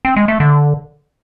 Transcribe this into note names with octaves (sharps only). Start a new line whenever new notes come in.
C4
G#3
A3
D3